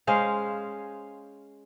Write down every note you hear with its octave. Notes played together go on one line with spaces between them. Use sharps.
G#3 C#4 C5 F5